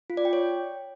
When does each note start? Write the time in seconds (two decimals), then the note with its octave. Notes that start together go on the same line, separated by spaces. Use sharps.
0.10 F4
0.17 D5
0.25 G5
0.33 C#5